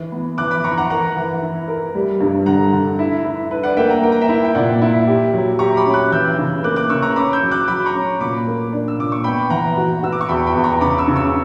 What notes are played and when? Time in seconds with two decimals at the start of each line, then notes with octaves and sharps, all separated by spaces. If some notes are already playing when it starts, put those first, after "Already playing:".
Already playing: E3
0.12 B3
0.38 E3 D6 F#6
0.51 B5 D6
0.64 E3 A#5 C#6
0.78 F#5 A#5
0.90 A#4 F#5 A#5
1.16 E3
1.42 E4
1.68 A#4
1.94 G3
2.21 G2
2.46 D3 F#5 A#5
2.73 D3
2.99 E4
3.25 E4
3.51 B4
3.63 D5 F#5
3.77 A#3 E5 G5
3.90 F#5 A#5
4.03 A#3 G5
4.12 A#5
4.21 E5 G5
4.29 E4
4.45 G5
4.55 A#2 D5 F#5
4.82 E4
5.07 G4
5.33 F#3
5.59 G4 A#5 C#6
5.77 B5 D6
5.86 C#4
5.94 D6 F#6
6.12 E3 E6 G6
6.38 C#3
6.63 A#3 D6 F#6
6.76 D6 F#6
6.89 C#3 C#6 E6
7.02 A#5 C#6
7.16 C#4 B5 D6
7.33 E6 G6
7.42 F#3
7.51 D6 F#6
7.68 F#3 B5 D6
7.86 A#5 C#6
7.94 C#4
8.20 A#2 B5 D6
8.47 A#3
8.73 D4
8.88 E6
8.98 A#2 D6
9.12 C#6
9.24 B3 G5 B5
9.50 E3 F#5 A#5
9.77 F#4
10.03 F#4 E6
10.12 D6
10.21 C#6
10.29 E2 G5 B5
10.47 G5 B5
10.55 E2
10.64 A#5 C#6
10.81 C#3 B5 D6
10.98 C#6 E6
11.08 C#3
11.16 C#6 E6